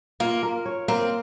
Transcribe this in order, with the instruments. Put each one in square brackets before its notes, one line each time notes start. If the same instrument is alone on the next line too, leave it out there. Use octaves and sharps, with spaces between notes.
[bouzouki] A#3 [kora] F4
[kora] A#4
C#5
[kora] A#3 [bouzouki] C4